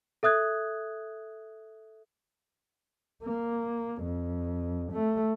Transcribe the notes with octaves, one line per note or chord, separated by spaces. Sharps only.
A4 E5 D#6 F#6 G#6
A#3
F2
A3